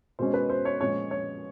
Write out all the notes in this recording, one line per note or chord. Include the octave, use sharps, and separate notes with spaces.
B2 G#3 C#4 C5
B4
C5
C#5
A#2 F3 G#3 C#4 C#5
C#5